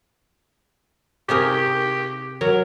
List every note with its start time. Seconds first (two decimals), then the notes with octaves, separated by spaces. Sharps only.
1.29 C3 G4 G#4 A#4
2.41 F#3 A#4